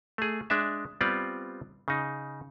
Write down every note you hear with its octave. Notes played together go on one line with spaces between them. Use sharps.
A3 G#4
G#3 D4 E5
G3 B3 C4 F4 D5
C#3 D#4